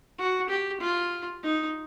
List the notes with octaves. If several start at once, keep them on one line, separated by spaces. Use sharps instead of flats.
F#4
G4
F4
D#4